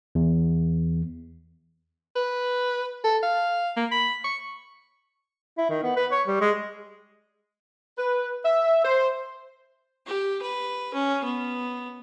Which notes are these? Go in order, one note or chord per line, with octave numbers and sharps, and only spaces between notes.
E2
B4
A4
F5
A#3
B5
C#6
E4
D#3
B3
B4
C#5
G3
G#3
B4
E5
C5
G4
B4
C#4
B3